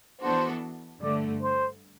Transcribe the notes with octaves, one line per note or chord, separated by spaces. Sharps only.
E3 B3 D4 F#4 A4 C5
G2 D3 A3 D5
C5